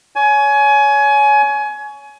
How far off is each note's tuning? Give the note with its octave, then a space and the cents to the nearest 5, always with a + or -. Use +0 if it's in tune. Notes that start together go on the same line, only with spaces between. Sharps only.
C#5 +25 G#5 +25